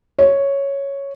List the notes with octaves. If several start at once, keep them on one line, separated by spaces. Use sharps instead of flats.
C#5